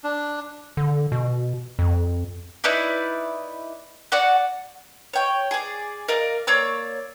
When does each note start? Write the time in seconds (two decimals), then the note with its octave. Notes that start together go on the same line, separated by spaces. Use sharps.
0.04 D4
0.77 D3
1.12 B2
1.79 F2
2.64 D#4 E4 B4 D5
4.12 F#4 D5 F#5
5.13 C#5 G5
5.51 G#4 D5
6.08 A#4 D5 D#5 F5
6.47 A#3 C#5 D5 E6